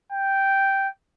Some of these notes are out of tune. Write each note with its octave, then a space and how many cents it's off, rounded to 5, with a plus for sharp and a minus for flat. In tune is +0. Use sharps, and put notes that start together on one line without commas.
G5 -5